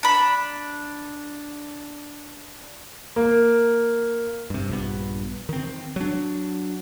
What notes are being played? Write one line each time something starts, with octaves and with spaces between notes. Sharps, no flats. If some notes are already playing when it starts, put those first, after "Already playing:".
D4 B5
A#3
G2 C3
A#1 G2 B3
D#3 C4
F#3 D4